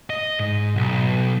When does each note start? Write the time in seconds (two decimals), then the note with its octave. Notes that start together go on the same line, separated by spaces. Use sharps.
0.10 D#5
0.39 G#2
0.76 B1